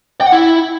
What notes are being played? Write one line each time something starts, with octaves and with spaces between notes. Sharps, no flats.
G5
F#5
E4